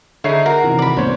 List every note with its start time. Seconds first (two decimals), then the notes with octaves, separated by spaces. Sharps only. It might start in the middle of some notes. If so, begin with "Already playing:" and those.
0.24 D3 D#4 E4 G#4 C#5 C7
0.46 F#4 A#4 A#5
0.63 C3 D#3 E3
0.79 D5 B5
0.97 C2 A2 B3 D4 C5 C#5